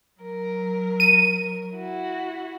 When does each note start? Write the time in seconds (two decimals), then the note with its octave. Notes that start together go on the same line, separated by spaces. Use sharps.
0.20 F#3 A#4
1.00 D#7
1.74 E4 F#4